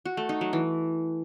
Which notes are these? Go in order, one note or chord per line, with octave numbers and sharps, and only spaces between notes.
F#4
A3
D#4
F#3
E3